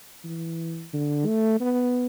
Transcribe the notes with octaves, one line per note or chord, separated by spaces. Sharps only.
E3
D3
A3
B3